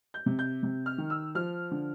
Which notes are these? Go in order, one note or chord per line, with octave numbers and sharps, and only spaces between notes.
G6
C3
G6
C3
F6
D#3
E6
F3 F6
D3